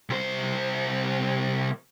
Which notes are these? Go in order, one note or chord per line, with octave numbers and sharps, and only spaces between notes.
C2 C5